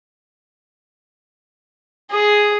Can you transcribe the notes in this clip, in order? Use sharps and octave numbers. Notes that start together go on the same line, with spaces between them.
G#4